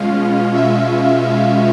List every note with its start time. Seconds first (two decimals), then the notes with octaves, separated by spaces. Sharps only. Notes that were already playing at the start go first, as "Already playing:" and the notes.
Already playing: B2 G#3 C#4 F4 F5
0.55 E5